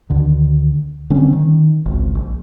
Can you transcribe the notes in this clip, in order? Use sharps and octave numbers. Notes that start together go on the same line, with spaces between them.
D2 D3 D#3
D3 G3 C4 C#4
D#3
G#1 C#2
A#1